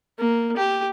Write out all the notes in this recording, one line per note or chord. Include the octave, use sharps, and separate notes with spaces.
A#3
G4